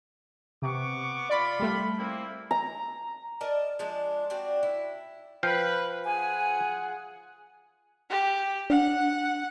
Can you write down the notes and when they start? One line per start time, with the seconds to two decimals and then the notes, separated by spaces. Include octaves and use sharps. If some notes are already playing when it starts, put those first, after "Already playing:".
0.62 C3 B3 C#6 D6
1.30 F4 D5 B5
1.60 G3 A3
1.98 A#3 C4 E4
2.51 A#5
3.41 A#4 D5 D#5 A5
3.79 F3 G#3 D4
4.30 C4 D4 F#4
4.63 E4
5.43 F3 B4 F5 G5
6.05 F4 G#4 F#5 G#5
8.10 G4
8.70 D4 F#5